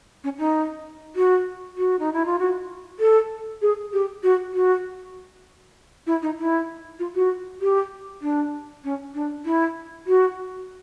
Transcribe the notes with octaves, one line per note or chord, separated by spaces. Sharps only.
C#4
D#4
F#4
F#4
D#4
E4
F4
F#4
A4
G#4
G4
F#4
F#4
E4
D#4
E4
F4
F#4
G4
D4
C#4
D4
E4
F#4